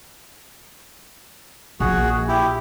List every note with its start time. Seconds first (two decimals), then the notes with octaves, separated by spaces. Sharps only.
1.80 A#1 F#4 G#4
2.28 E4 G4